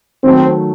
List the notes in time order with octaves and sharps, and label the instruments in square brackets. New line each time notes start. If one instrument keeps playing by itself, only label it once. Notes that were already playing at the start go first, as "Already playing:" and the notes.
[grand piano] D#3 F#3 A3 [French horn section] C4